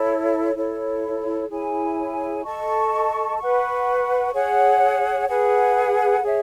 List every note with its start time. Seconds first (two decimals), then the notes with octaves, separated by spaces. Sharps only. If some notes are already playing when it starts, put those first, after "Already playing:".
Already playing: E4 A4 C#5
0.55 E4 A4 C#5
1.50 E4 G#4 C#5 G#5
2.44 A4 D#5 A5 C#6
3.38 B4 F#5 C#6
4.34 G#4 C#5 F#5
5.28 G#4 B4 F#5
6.22 G#4 C#5 E5